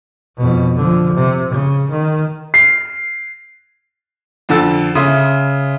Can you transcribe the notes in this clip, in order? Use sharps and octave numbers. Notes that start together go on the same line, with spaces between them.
F2 B2
D3 F3
C3
C#3
D#3
C7
F2 D3 A4 E6 A6
C#3 E5 C6 D#6